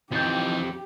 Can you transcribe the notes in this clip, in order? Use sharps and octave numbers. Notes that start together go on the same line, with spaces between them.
F2 E3 D#4 G4 G6 A6